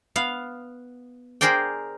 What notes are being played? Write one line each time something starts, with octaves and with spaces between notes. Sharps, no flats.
B3 F5
G#4 A#4 C5 D5 G5